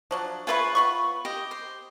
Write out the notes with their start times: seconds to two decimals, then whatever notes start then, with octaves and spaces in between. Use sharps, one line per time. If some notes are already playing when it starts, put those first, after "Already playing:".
0.11 F3 F#3 D4
0.47 F4 G#4 B4 C#5 E5 B5
0.75 B3 B5 C#6
1.25 G4 D#5
1.51 C5